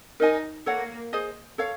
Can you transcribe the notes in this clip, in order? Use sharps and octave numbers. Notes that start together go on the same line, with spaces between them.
D#4 A#4 D#5 G#5
A#3 A4 C#5 F#5
G#4 C5 D#5
A4 C#5 F5